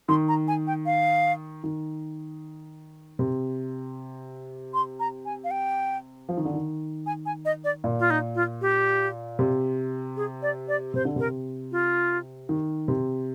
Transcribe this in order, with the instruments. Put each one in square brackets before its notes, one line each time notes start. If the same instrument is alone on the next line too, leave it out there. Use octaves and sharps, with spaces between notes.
[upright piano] D#3 [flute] C6
[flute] A#5
G#5
G5
F5
[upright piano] D#3
C3
[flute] C6
A#5
G#5
F5
G5
[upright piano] F3
D#3
D3
D#3
[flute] G#5
G#5
D#5
D5
[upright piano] A#2
[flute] F4
D#4
F4
G4
[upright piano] C3
[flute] G#4
D5
D5
[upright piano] C3 [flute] C5
[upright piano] D3
[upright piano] C3 [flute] A#4
[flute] F4
[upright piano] D#3
C3